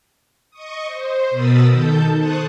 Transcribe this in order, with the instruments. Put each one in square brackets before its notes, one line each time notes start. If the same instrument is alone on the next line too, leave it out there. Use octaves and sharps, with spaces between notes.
[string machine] D#5 C#6 D#6
C5
B2 A#4 B5 D#6 E6 A6
D#3 A4 A5 G6
C5 A5 C#6 D#6 F#6